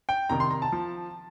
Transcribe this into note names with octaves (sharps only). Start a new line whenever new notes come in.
G5
C2 C3 D#3 A#5
C6
A#5
A5
F3